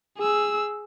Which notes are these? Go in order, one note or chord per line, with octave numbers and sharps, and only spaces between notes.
G#4 E6